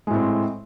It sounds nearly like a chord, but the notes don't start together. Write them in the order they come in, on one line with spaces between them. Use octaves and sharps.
G#3 A2 C4